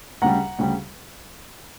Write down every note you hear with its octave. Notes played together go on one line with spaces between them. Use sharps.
D2 C#3 G3 F#5 A#5
D2 C#3 G3